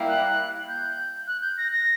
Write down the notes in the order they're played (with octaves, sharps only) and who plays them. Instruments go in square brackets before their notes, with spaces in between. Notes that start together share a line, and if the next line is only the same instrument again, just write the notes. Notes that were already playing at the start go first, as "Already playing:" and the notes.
Already playing: [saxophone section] G3 A#3 E4
[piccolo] F#6
G6
F#6
G6
A#6
A#6